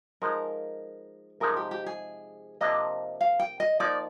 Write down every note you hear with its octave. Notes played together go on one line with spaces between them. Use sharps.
F3 G#3 D#4 A#4
C3 F3 G#3 D#4 A#4
G4
G4
G#4
C3 F3 A#3 D4 D#5
F5
G5
D#5
F3 A#3 D#4 D5